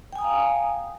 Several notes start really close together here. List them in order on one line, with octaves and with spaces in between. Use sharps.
G5 G#5 D#6 A#5 F5